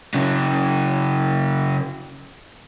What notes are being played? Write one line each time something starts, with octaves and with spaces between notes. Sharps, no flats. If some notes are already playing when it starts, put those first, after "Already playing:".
C#3 F#3